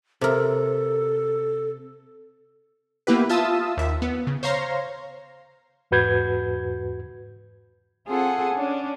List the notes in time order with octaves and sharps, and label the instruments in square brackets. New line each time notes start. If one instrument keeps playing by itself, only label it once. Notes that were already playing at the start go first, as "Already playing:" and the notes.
[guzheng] C3 A#4 [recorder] A4
[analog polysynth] A#3 B3 E4 G4 B4
F4 E5 A5 D#6 E6
D#2 E5
B3
C#3
C5 C#5 F5 A#5 C6
[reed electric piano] E2 G#2 F#4 B4 G6 G#6
[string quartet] C4 F4 G#4 A4 F#5 G#5
C#4 D4